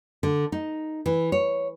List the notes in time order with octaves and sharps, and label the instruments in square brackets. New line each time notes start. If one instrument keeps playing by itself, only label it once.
[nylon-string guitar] D3
D#4
E3
C#5